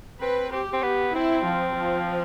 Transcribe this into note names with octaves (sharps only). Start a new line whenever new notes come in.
C4 B4
C4 G4
C4
B3
C4 E4
F3
F3